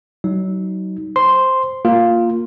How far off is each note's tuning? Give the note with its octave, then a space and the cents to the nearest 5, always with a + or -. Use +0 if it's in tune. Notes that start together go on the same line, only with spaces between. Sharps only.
F#3 +30 D#4 +15
C5 +0 C6 +0
A#3 -5 F4 +0